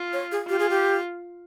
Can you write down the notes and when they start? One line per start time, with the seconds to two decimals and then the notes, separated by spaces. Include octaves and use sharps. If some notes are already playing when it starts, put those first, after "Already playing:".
Already playing: F4
0.13 C#5
0.32 G#4
0.49 F4 G4
0.59 G#4
0.70 G4